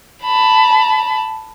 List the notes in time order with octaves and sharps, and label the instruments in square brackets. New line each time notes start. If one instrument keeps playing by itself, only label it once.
[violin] A5 B5